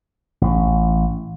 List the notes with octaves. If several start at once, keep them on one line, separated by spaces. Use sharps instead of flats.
A1